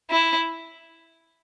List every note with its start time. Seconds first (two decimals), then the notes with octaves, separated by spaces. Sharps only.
0.10 E4